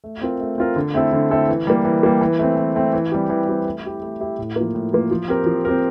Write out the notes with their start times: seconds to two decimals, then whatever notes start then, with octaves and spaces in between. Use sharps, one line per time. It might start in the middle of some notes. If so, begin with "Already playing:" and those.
0.04 A3
0.21 C4 F4 A#4
0.41 A3
0.58 C4 F4 A#4
0.76 D3
0.94 A3 C4 E4 A4
1.13 D3
1.31 A3 C4 E4 A4
1.48 E3
1.67 G3 A#3
1.85 E3
2.03 G3 A#3
2.21 E3
2.39 A3 C4
2.57 E3
2.75 A3 C4
2.93 E3
3.12 G3 C4 G4
3.30 E3
3.48 G3 C4 G4
3.66 A3
3.84 E4 G4
4.02 A3
4.20 E4 G4
4.39 A2
4.56 F3 A#3
4.75 A2
4.93 F3 A#3
5.11 F3
5.28 C4 G4 A#4
5.46 F3
5.65 C4 G4 A#4